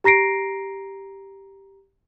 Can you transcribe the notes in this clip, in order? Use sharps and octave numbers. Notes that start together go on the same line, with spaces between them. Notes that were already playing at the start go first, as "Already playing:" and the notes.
G4 A#5 A#6 C7 D7